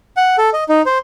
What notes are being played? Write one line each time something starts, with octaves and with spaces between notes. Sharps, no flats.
F#5
A4
D#5
D#4
C5